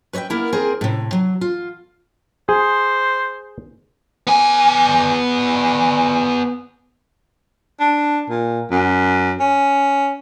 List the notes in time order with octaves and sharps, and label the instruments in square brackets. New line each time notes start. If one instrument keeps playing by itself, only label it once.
[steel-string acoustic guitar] B4 C#5 D#5 E5 G5
A#3 B3 E4 A#4
C4 G#4 A#4 C5
A2 C3
F#3
F4
[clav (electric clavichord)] G#4 [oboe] C5
[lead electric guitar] B3 G#5
[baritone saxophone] D4
A#2
F#2
C#4